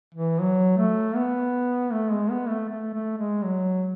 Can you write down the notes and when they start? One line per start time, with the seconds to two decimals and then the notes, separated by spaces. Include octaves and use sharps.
0.15 E3
0.41 F#3
0.78 A3
1.16 B3
1.92 A3
2.11 G#3
2.30 B3
2.48 A3
2.68 A3
2.93 A3
3.18 G#3
3.44 F#3